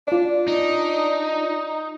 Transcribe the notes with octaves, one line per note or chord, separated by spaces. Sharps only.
D4 F4 D5
D#4